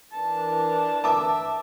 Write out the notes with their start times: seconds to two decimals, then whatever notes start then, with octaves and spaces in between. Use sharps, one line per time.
0.13 E3 D4 A#4 A5
1.04 E5 A5 D6